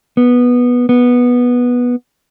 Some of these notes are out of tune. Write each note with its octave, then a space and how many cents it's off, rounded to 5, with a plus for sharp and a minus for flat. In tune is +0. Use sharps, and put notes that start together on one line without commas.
B3 -10
B3 -10